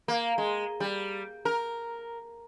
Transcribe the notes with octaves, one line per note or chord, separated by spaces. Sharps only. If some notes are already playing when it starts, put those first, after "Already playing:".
A#3
G#3
G3
A#4